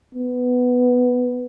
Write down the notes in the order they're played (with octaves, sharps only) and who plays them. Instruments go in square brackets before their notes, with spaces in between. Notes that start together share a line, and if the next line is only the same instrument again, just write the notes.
[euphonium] B3